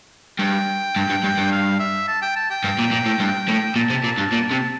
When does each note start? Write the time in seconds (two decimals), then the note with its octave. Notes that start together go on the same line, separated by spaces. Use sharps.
0.39 G2 G5
0.96 G2
1.10 G2
1.23 G2
1.37 G2
1.52 F5
1.80 E5
2.08 A5
2.22 G5
2.36 A5
2.50 G5
2.64 G2
2.79 A#2
2.91 A#2
3.06 A2
3.20 G2
3.48 A2
3.76 A#2 A5
3.90 C3
4.04 A#2
4.18 G2
4.32 A#2
4.51 C3